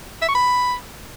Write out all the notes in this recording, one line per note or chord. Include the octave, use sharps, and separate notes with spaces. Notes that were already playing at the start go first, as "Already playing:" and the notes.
E5
C#6
B5